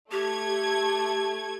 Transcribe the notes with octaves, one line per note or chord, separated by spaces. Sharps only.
A3 G4 G#6